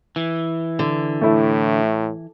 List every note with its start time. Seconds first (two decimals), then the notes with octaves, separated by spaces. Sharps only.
0.16 E3
0.79 D3
1.21 A2 A3 E4